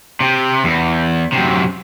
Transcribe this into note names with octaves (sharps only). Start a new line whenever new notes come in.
C3
E2
F#2 C3